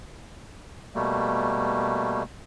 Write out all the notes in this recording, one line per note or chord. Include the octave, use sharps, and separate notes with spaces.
B2 G3 A3 A#3